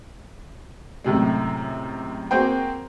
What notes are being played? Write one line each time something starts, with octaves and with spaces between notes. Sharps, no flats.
F#2 A2 C3 G#3
A#3 C4 F#4 G#4 C5 G5